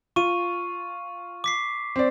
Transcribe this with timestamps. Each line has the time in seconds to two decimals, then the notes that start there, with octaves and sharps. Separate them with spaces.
0.16 F4 C#6 D#7
1.44 D6 B6 C7
1.96 C4 D5